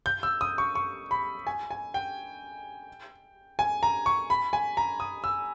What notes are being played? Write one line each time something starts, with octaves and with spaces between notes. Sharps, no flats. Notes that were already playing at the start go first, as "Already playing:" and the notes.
G6
E6
D#6
C#6
C#6
B5
G#5
G#5
G5
G#5
A#5
C#6
B5
G#5
A#5
D#6
E6